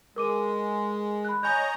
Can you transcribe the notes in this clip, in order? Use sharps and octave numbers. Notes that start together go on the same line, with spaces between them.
G#3 A#4 D6 D#7
B5 F#6
C#5 D#5 G#5 A#5 G6